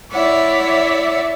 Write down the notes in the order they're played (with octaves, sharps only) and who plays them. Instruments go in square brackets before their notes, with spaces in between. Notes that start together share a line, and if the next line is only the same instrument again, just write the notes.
[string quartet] E4 C#5 D5 E5 F#5